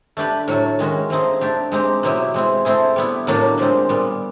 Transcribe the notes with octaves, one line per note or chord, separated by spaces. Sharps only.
A3 D4 G4 B4
A2 F#3 A3
D#3 G#3 C#4 F#4
F3 A3 C4 D#4 G#4
A3 D4 G4
G#3 C4 D#4 G4
B2 F#3 B3 E4 G4
G#3 C4 E4
A3 C4 E4 G#4
G3 B3 E4
A2 F#3 A#3 D4 G4
A#2 F3 G#3 C4
A#2 G3 B3